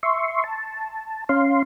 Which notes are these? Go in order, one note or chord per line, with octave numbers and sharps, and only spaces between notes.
E5 C6 C#6
A5
C#4 F5 C6